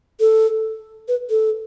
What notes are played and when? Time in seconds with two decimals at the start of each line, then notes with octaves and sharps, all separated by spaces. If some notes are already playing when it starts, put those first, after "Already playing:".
0.20 A4
1.08 B4
1.30 A4